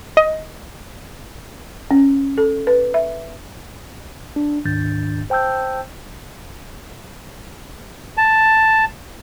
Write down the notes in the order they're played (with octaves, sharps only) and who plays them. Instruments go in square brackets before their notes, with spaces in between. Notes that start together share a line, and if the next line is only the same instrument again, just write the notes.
[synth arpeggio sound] D#5
[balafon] C#4
A4
B4
E5
[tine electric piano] D4
D2 G#2 D#3 D4 G6 A6
C5 G5 A5 E6 G6
[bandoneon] A5